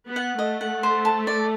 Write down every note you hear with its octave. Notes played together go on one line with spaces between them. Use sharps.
B3
F#5
A3 D#5
F#5
C5
A5
D5